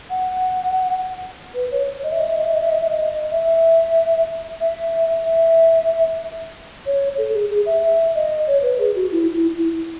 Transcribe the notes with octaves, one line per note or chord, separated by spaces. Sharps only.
F#5
B4
C#5
C#5
D#5
E5
D#5
E5
D#5
E5
D#5
E5
D#5
E5
D#5
E5
E5
E5
C#5
A4
G#4
G#4
E5
E5
D#5
C#5
B4
G#4
F#4
E4
E4
E4